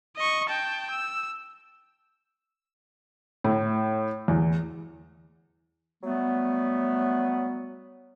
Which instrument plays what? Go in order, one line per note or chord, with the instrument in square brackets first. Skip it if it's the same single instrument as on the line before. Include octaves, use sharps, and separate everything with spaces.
[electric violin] D#5 C#6
G5 A5
E6
[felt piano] A2
E2
[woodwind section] F#3 G3 A3 B3